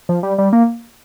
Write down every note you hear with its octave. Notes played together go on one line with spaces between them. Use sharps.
F3
G3
G3
A#3